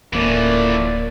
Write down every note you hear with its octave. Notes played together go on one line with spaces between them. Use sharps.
D1 A2 E3 F3 A#3 A#4 D5